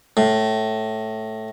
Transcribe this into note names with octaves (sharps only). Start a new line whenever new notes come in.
A2